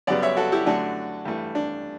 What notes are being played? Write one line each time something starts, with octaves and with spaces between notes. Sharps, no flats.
F#2 C#3 G3 B3 D5 F#5
C#5 E5
F#4 A4
E4 G4
F#2 D3 A3 D4 F#4
G2 E3 A3
D4